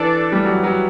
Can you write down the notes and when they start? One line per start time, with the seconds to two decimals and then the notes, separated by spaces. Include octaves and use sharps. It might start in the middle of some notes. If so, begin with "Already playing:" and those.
Already playing: E3 D4 A4 D5
0.32 G3
0.45 F#3
0.64 F#3